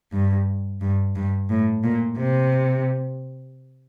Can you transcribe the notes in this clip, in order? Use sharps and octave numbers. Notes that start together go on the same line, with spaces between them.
G2
G2
G2
A2
A#2
C3